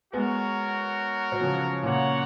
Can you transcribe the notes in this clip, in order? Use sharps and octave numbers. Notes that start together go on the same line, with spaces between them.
G#3 B3 F#4 A#4 C#5
F#3
C#3 F3
A#2 C#3 F#4 A#4 C#5 F#5